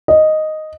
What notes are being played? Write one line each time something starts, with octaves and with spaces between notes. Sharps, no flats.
D#5